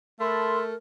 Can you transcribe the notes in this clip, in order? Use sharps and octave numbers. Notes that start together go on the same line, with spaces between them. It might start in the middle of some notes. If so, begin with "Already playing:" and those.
A3 A4 A#4 E5 B5 C6